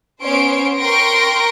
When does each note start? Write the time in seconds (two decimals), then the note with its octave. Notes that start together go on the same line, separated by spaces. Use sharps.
0.22 B3 C#4 C5 C#5 C6 D7
0.77 A#4 G5 C6 C#6 A#6 D7